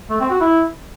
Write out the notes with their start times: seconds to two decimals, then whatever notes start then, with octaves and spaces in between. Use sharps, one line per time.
0.10 A3
0.20 C4
0.30 F#4
0.41 E4